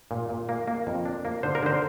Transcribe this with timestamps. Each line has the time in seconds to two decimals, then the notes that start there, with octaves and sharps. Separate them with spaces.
0.11 A#2
0.29 A#2
0.49 A#3
0.67 A#3
0.87 F2
1.05 D4
1.25 A#3
1.43 D3 C5
1.55 A#4
1.63 D3 C5